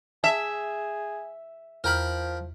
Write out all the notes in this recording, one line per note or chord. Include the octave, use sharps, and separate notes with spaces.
G#4 E5 A5
E2 F3 A#4 G5 A#5 B5 F6